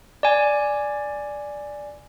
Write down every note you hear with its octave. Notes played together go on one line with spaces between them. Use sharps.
D5 G#5